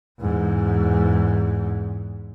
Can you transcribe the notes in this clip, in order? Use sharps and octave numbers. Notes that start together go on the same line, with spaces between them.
E2 G#2